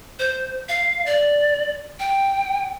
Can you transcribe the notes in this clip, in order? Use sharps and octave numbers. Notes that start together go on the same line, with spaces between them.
C5
F5
D5
G5